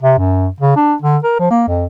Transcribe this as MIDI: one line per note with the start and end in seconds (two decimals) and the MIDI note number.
0.03 0.17 48
0.18 0.47 42
0.60 0.76 49
0.76 0.94 62
1.02 1.17 50
1.24 1.36 70
1.39 1.48 53
1.50 1.63 58
1.68 1.86 41